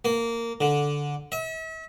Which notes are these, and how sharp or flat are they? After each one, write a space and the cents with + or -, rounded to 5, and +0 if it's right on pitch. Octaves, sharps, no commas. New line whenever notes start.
A#3 -10
D3 -10
E5 -40